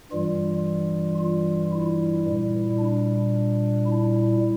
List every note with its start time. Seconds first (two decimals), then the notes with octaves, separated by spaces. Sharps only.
0.11 G2 E3 G3 F4
1.19 F4
1.72 E4
2.25 A#2 G3
2.79 D4
3.86 E4